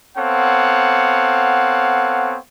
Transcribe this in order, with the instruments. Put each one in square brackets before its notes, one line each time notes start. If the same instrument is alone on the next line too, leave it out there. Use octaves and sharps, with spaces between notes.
[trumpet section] B3 C4 A4 C#5 F5 F#5